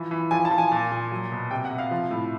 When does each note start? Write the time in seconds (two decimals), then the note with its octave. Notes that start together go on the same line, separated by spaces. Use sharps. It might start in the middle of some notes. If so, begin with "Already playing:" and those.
Already playing: E3 F3
0.11 E3
0.31 F3 G#5
0.45 A5
0.51 F3
0.58 G#5
0.72 A#2
0.91 A#2
1.12 F#3
1.32 B2
1.51 C3 G5
1.65 F#5
1.71 C3
1.79 F5
1.91 F3
2.11 A2